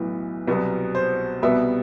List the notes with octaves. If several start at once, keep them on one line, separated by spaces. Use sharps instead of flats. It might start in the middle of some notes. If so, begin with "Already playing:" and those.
Already playing: B1 A2 E3 B3
C2 B2 F#3 B3
C5
C2 B2 G3 B3 E5